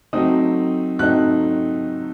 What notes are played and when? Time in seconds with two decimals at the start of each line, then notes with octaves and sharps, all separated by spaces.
0.13 F#3 A3 C4 D#4 D#6
0.99 F#3 A3 C4 D#4 F#6